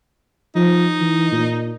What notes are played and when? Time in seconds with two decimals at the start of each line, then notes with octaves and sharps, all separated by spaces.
0.55 F3 D#4
1.00 E3
1.32 A#2